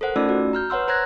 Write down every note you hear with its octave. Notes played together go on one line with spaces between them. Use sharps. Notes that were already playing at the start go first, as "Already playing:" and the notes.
A4 A#4 C5 F#5
A3 C#4 D#4 F4 D5 E6
F#4
A#5 F6 G6
B4 C#5 F#5 C6 E6
C5 A#5 F#6 G#6 A#6